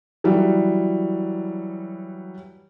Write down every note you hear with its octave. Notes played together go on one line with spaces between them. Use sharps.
E3 F#3 G3